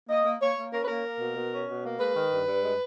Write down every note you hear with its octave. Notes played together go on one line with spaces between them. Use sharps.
A#3 D#5
A#3
A#3 C#5
A#3
C#4 A#4
B4
A#3 A#4
A#3
B2
B2
C#4
B2
A#3
G#3 B4
D#3
G2
G2
G#3